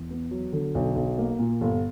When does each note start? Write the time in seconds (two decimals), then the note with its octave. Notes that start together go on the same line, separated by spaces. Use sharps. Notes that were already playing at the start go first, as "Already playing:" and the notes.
Already playing: E2
0.11 B3
0.31 F#3
0.53 D3
0.75 B1
0.96 B1
1.18 A#3
1.39 A#2
1.61 G1